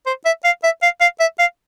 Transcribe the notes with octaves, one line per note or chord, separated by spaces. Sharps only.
C5
E5
F5
E5
F5
F5
E5
F5